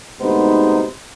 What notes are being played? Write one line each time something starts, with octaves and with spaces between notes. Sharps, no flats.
D2 G#2 C3 B3 D#4 C5